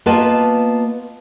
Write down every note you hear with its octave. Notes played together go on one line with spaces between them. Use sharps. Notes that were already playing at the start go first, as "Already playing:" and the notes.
A#3 B3 F4 B4 D#5 A5